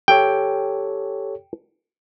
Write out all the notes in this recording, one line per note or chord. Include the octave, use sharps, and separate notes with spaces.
G4 A4 C#5 G5